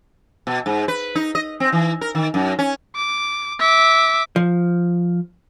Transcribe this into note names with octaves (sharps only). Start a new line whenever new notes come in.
B2
G#2
B4
D#4
D#5
C4
E3
A#4
D#3
F#2
C#4
D6
E5 D6
F3